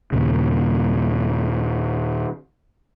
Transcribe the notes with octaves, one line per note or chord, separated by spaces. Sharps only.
D#2 A#2 C#3